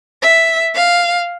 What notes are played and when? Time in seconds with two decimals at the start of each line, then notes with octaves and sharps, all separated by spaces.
0.23 E5
0.75 F5